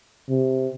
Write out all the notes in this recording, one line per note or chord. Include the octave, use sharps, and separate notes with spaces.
C3